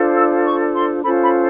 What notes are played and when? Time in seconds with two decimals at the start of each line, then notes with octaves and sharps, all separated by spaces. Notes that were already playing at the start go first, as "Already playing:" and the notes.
Already playing: D4 F4 A4 C5
0.16 E6
0.46 C#6
0.75 C6
1.03 C#4 F4 A4 C5 B5
1.23 B5